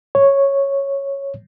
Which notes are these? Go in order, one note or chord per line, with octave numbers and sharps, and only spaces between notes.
C#5